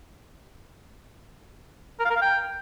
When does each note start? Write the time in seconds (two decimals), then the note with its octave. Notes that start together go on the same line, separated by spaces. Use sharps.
1.99 A#4
2.05 F5
2.10 A#4
2.16 F5
2.22 G5